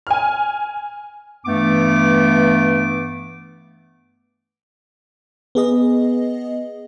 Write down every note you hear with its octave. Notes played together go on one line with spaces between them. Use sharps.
G#5 F6
G2 E3 A3 B3 D6
B3 G#4 D#5